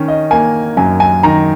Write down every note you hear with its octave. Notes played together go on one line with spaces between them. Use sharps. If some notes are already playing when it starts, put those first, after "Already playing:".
Already playing: D#3 C#4
D#5
A#3 G#5
F#2 G#5
G#5
D#3 A#5